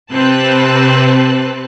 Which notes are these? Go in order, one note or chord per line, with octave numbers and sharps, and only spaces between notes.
C3 C4 B4 A5 F#6